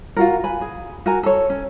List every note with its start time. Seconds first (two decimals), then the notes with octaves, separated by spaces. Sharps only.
0.17 F4 F#4 A#4
0.44 B4 G#5 B5
0.61 G#4
1.06 F#4 A#4 G#5 A#5
1.23 A4 C5 C#5
1.50 C#4